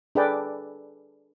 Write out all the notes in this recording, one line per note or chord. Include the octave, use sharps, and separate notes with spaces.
D4 G#4 A4 B4 D5 G5